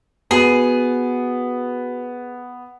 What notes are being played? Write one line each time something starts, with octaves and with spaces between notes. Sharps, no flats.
B3 F#4 G#4